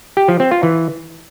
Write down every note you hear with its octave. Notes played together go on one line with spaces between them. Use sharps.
G4
F3
C4
F4
E3